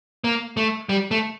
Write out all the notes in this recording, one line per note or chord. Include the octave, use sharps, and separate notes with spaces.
A#3
A3
G3
A3